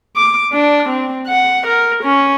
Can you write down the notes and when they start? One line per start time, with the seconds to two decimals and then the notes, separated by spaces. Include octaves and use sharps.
0.16 D6
0.53 D4
0.89 C4
1.27 F#5
1.67 A#4
2.04 C#4